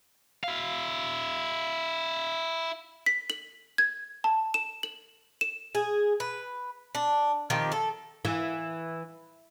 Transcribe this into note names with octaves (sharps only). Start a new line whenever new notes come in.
E4 F5
B6
F#7
G#6
A5
E7
F#7
E7
G#4
B4
D4
D#3 F3 C4 G4
A4
E3